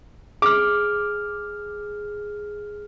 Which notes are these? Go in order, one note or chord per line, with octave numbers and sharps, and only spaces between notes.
G#4 D6 F6